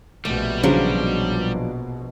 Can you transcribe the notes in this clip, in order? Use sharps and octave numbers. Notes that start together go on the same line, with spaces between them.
A#1 B2 G3 A3
C#3 F3 F#3 D4